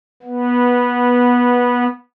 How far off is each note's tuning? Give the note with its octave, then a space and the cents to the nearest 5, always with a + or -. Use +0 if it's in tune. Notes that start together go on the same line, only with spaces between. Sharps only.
B3 -15